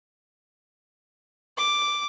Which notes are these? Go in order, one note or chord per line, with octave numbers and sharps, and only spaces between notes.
D6